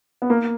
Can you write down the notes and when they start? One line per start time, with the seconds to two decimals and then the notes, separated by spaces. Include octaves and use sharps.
0.22 B3
0.30 A#3